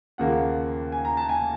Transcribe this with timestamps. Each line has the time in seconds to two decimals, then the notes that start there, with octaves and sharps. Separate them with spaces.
0.18 D#2 C#3 F3 A#3 F#5
0.92 G#5
1.05 A#5
1.17 A5
1.29 G#5